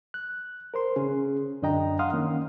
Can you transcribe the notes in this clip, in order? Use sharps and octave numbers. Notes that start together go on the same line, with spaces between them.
F#6
A#4 C5 C6
C#3 C#4 G#4
F#2 D3 D4 D#5 G5 A#5
F5 F#5 C6 D#6 F6
D#3 A#3 C#4